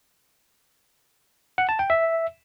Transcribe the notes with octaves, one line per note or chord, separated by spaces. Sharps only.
F#5
A5
G5
E5